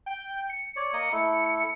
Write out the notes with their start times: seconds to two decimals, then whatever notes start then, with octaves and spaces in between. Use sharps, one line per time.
0.06 G5
0.49 C#7
0.76 C#5 D5
0.93 A#3 D#5 D#6
1.12 A3 E4